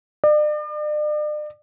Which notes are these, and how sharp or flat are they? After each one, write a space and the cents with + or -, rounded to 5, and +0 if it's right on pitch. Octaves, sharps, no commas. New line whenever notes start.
D5 +40